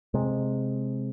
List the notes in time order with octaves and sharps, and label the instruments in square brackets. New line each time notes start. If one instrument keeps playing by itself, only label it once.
[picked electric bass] C3 G#3